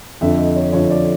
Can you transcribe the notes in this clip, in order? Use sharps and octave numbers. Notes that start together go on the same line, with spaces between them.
F2 D3 F3 E5
D#5
C#5
F2 D3 F3 C#5
D5